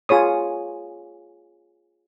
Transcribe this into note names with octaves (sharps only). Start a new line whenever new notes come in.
F4 G#4 C#5 D#6